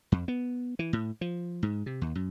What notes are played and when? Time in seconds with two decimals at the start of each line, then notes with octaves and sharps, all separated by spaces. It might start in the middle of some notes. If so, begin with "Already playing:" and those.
0.12 F2
0.28 B3
0.79 E3
0.93 A2
1.21 F3
1.63 G#2
1.86 C3
2.01 D#2
2.15 F#2